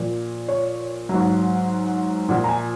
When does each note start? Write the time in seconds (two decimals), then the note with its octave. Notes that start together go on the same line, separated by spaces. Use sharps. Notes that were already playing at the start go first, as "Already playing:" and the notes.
Already playing: A#2 F3
0.48 C#5
1.09 G#2 F#3
2.29 A#2 F3 F#5
2.44 A#5
2.49 G#5